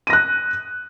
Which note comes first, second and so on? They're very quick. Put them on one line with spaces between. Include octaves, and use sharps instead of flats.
D#7 A#6 F#6